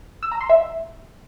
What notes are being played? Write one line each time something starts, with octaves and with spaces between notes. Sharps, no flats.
E6
A#5
C6
E5